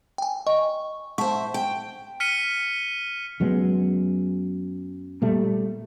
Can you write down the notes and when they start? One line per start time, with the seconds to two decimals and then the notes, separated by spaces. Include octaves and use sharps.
0.18 G5 G#5
0.47 D#5 C#6
1.18 C5 E5 F#5 A5 C#6
1.54 G5
2.20 F6 B6 C#7 D#7 G7
3.40 F#2 F#3 G#3 B3
5.22 A#2 G3 A3